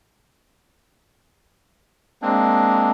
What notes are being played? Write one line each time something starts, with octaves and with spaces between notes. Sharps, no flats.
G#3 A#3 C4 D4